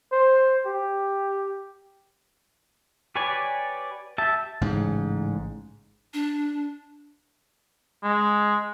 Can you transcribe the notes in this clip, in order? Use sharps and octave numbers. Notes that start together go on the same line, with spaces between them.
C5
G4
G4 B4 C#5 D5 G#5
G4 E5 A5
A1 G#2 C#3
D4
G#3